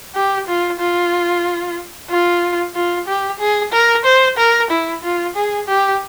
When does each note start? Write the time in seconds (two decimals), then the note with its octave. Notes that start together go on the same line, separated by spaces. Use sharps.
0.15 G4
0.48 F4
0.79 F4
2.10 F4
2.75 F4
3.07 G4
3.39 G#4
3.73 A#4
4.04 C5
4.38 A#4
4.70 E4
5.03 F4
5.36 G#4
5.68 G4